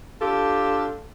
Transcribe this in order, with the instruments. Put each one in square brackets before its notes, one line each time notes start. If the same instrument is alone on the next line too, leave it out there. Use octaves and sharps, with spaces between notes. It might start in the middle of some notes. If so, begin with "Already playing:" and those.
[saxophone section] D4 F4 G4 A4